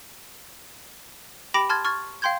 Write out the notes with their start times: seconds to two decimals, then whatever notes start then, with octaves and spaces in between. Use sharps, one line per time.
1.54 G4 G5 B5 D6 A#6 D7
1.69 A5 C6 F6 G#6 A6
1.85 C#6 F6 G#6 A6
2.22 F5 G5 C6 G6 G#6